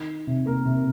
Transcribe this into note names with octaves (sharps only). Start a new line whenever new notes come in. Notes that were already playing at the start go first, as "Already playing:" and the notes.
Already playing: D#3
C3
A#3 A#4
C3